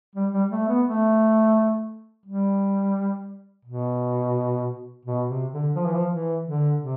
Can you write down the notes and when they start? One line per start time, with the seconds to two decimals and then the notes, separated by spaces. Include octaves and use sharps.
0.15 G3
0.33 G3
0.51 A3
0.68 B3
0.86 A3
2.26 G3
3.65 B2
5.05 B2
5.28 C3
5.52 D3
5.75 F3
5.85 E3
5.94 F3
6.10 E3
6.45 D3
6.80 C3